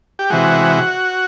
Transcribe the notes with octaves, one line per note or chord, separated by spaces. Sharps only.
G4
C3 E3 G#3 F#4